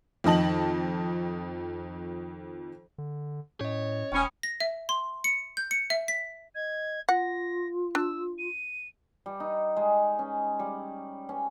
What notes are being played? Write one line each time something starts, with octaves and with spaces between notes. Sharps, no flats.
F2 D#3 D#5 A5 F#7
D3
A2 C#4 C#5 D#5
E1 C#4 G5 B5 D#6
A#6
E5
C6
C#7
G6
C#7
E5
B6
D#5 G#6
F4 F#5 A#6
D4 E6
D#7
G3
D#4
G#3
C#4
G3
C#4